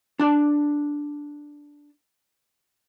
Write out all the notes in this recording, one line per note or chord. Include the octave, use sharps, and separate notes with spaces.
D4 A5